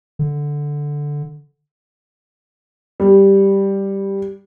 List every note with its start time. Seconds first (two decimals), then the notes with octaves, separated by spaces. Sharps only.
0.19 D3
3.00 G3